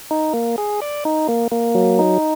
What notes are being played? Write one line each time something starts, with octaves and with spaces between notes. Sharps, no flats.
D#4
A#3
G#4
D5
D#4
A#3
A#3
F#3
D#4